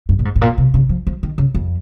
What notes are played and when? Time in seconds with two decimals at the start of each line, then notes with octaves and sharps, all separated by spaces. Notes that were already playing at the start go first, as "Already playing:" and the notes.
0.09 G2
0.19 A#2
0.25 G#2
0.36 G#2
0.41 A#2
0.58 C3
0.74 C#3
0.89 F3
1.07 F3
1.23 D#3
1.38 C#3
1.55 F2